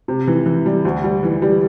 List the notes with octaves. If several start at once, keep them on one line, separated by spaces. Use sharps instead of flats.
C3
E3
E3
G3
D2
G3
E3
G3